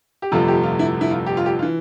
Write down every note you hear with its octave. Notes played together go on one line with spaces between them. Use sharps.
G4
G1 F2 C3 F3 A3 F4
G4
F4
E4
E4
F4
G4
F4
G4
F4
E3